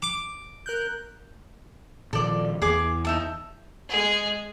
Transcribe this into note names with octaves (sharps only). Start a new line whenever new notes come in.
D6
A#4 F#6 G6
A#2 D#3 F3 A4 D5
E2 G#4 D6
D#4 E5 A5
G#3 G#4